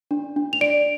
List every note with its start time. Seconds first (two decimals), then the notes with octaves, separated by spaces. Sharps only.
0.11 D4
0.36 D4
0.53 F7
0.61 D5 D7